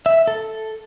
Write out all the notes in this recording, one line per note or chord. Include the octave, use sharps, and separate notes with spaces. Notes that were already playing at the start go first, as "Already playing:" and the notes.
E5
A4